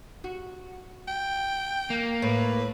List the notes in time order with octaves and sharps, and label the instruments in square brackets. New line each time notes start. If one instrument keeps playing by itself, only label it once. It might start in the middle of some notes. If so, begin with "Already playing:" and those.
[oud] F#4
[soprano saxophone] G5
[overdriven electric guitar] A#3
[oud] A2 [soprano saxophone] B4